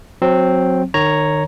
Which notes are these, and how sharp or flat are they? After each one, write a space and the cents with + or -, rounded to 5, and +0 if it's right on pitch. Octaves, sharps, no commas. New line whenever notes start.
F#3 -15 C4 +0
D#3 -30 C#5 +0 A#5 +0